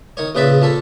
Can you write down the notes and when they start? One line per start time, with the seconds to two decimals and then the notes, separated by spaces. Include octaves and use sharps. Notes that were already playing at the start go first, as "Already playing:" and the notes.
0.17 D#3 C#5
0.35 A#1 C#3 B4 D5 E5 B5
0.62 A#2 A4 B5